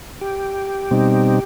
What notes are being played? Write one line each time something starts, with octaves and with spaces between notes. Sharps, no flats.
G4
B2 G3 C4 D#4